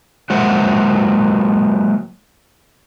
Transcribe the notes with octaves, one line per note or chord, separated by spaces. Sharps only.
F#3 G#3 A#3 E4 C5 F#5